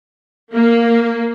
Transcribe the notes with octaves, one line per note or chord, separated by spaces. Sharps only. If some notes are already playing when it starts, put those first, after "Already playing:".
A#3